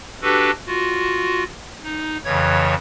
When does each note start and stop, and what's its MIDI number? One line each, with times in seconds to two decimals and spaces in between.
0.22 0.51 62
0.22 0.51 66
0.22 0.51 67
0.22 0.51 69
0.22 0.51 71
0.67 1.44 65
0.67 1.44 66
1.83 2.17 63
2.24 2.75 41
2.24 2.75 49
2.24 2.75 52
2.24 2.75 73
2.24 2.75 92